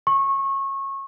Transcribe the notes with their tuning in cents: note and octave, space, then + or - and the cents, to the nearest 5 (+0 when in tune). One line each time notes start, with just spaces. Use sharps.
C#6 -25